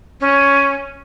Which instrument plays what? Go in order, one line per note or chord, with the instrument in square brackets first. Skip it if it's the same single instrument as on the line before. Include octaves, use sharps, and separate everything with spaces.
[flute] C#4